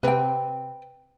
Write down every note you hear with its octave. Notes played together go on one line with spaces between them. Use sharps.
C3 C4 B4 G5